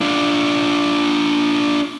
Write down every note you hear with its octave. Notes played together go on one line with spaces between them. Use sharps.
D4 F4